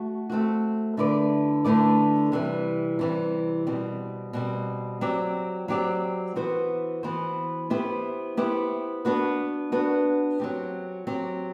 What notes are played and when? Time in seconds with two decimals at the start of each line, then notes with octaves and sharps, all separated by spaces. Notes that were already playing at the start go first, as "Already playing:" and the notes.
Already playing: A3 F#4
0.30 A3 C4 F#4
0.97 D3 A3 E4 B4 D5
1.64 D3 A3 E4 B4 D5
2.32 C3 E3 G3
2.99 C3 E3 G3
3.67 B2 G3 C4
4.33 B2 G3 C4
5.01 F#3 C4 G4 D5
5.68 F#3 C4 G4 D5
6.36 E3 B3 F#4 C5
7.03 E3 B3 F#4 C5
7.70 B3 E4 G4 C5
8.37 B3 E4 G4 C5
9.05 B3 D4 F#4 B4
9.72 B3 D4 F#4 B4
10.40 F#3 C4 G4
11.07 F#3 C4 G4